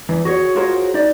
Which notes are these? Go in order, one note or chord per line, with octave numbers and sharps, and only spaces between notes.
E2
F#4 G#4 C5 C#5
F4 F#4 G#4 A#4 C5 C#5
D#4 D5